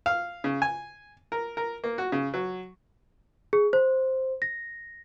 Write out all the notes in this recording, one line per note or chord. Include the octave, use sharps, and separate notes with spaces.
F5
C#3
G#5
A#4
A#4
A#3
F#4
C#3
F#3
G#4
C5
A#6